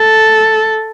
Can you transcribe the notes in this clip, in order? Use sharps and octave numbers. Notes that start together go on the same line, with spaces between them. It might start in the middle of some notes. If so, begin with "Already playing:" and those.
Already playing: A4